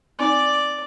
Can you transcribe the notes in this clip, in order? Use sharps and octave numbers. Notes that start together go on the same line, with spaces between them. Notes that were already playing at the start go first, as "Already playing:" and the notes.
C4 D#4 D5 G#5